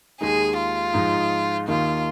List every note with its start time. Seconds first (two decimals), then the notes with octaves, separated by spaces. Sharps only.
0.21 D#2 D#3 G#3 D#4 G#4
0.58 F4
0.94 G#2 F3 G#3 D#4
1.68 D#2 D#3 A#3 D#4 F4